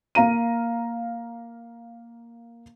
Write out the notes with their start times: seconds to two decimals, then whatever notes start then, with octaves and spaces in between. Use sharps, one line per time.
0.15 A#3 F5 A#5 D#7